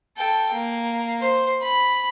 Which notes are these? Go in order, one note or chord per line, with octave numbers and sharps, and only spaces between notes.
A4 G5
A#3
C5
B5